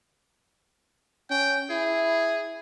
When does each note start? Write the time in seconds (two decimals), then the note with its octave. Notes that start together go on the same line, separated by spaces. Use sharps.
1.30 C#4 G5
1.70 E4 G#4